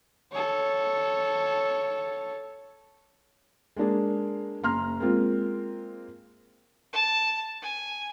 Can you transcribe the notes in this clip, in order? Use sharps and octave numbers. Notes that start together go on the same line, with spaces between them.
A4 C#5
G#3 A#3 D4 G#4
F#1 A#5 C6 F6
G#3 A#3 C4 F4
A5
G#5